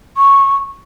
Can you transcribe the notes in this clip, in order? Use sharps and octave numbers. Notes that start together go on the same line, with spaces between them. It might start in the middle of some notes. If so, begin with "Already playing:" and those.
C#6